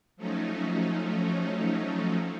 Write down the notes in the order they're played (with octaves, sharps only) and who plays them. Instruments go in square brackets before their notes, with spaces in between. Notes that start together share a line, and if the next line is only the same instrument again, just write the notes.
[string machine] F3 F#3 A3 C#4 D#4